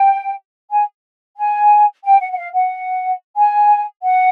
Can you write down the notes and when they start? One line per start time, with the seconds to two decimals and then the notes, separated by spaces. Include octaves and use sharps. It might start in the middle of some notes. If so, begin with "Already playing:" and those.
Already playing: G5
0.70 G#5
1.37 G#5
2.04 G5
2.20 F#5
2.31 F#5
2.36 F5
2.53 F#5
3.36 G#5
4.02 F#5